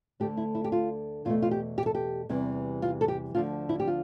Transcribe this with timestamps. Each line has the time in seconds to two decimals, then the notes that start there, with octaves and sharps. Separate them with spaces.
0.20 D2 D3 A3 D4 G4
0.37 E4
0.55 E4
0.64 G4
0.72 F4
1.25 E2 B2 A3 F4
1.42 F4
1.51 G4
1.78 G4
1.86 A4
1.95 G4
2.29 E2 C3 E3 G3
2.82 F4
3.01 A4
3.08 G4
3.34 D2 D3 F3 F4
3.69 E4
3.80 G4
3.87 F4